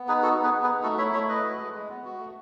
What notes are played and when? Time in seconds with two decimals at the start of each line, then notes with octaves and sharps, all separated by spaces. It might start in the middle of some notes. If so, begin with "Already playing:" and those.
Already playing: B3
0.08 D#4 G#4 B4
0.22 F#4 A4
0.38 B3
0.43 G#4 B4
0.53 B3
0.63 G#4 B4
0.68 D#4
0.83 A3 F#4 A4
0.98 E4 C#5 E5
1.13 A3 C#5 E5
1.29 E4 B4 D#5
1.44 F#4
1.59 G#3
1.74 G#3
1.90 B3
2.05 F#4
2.19 A3